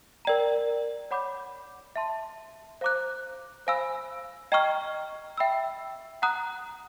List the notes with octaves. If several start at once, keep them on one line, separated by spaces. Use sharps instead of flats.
A#4 D5 G5 A#5
C#5 F#5 B5 D6 G6
E5 A5 C6
C5 F5 A#5 D6 F#6
C5 F5 G#5 B5 E6
D#5 G5 A#5 C#6 F6
E5 G5 B5 E6
F#5 A#5 D#6 F#6